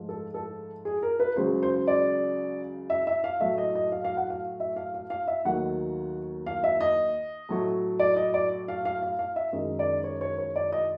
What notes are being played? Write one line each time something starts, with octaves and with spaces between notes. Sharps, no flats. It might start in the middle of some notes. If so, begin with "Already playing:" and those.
Already playing: G#2 F3 A3
A4
A4
G#4
A#4
B4
C#2 C#3 F#3 C5
C5
D5
E5
E5
F5
A2 F#3 A3 E5
D#5
D#5
F5
F5
F#5
F5
E5
F5
F5
F5
E5
D#2 D#3 F#3 A3 F#5
F5
E5
D#5
A2 F#3 A3
D5
D#5
D5
F5
F5
F5
F5
E5
F#2 D#3 G#3 D#5
D5
C#5
C#5
C#5
D5
D#5